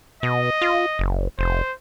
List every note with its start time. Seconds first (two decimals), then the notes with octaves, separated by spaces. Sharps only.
0.23 B2 D#5
0.62 F4
0.99 F#1
1.39 F1 C5